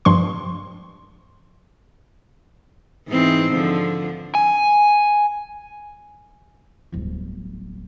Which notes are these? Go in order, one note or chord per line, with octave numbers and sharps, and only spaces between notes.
G2 F3 C6 C#6
G#2 E3 C4
D3 F3
G#5
D1 G1